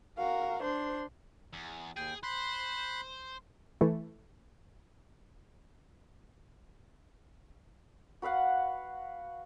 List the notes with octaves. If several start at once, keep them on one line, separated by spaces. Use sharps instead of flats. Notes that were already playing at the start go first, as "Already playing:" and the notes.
F#4 A#4 F5
D4 C5 C6
E2
D#2 G#4 G5
C5 B5 C6 F#6
E3 A3
F#4 B4 F5 F#5